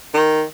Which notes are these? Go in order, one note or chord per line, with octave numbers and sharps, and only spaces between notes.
D#3